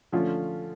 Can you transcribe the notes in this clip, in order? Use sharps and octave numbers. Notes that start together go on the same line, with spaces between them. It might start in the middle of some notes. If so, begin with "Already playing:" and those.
D3 F3 A3 C#4 F4